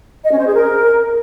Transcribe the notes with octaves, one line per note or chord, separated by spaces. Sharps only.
D#5
C#4
C5
G#4
A#4